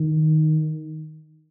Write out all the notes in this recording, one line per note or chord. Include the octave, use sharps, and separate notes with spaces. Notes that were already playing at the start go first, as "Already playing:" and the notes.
Already playing: D#3